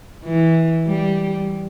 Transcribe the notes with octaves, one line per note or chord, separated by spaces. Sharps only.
E3
G3